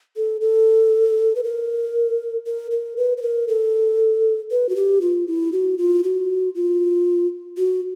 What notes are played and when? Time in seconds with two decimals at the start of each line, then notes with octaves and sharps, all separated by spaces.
0.16 A4
0.41 A4
1.35 B4
1.44 A#4
2.46 A#4
2.71 A#4
2.97 B4
3.17 B4
3.22 A#4
3.48 A4
4.51 B4
4.69 F#4
4.76 G4
5.01 F4
5.27 E4
5.52 F#4
5.78 F4
6.04 F#4
6.55 F4
7.57 F#4